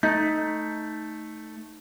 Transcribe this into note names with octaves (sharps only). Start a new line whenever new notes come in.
A3 D#4 G6